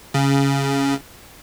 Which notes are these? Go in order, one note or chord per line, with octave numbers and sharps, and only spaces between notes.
C#3